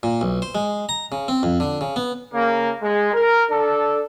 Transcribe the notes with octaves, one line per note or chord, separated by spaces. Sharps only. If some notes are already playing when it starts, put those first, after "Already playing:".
A#2
B1
C5
G#3
A#5
C#3
C4
F2
D3
C#3
B3
C#3 A#3
G#3
A#4
D4 A4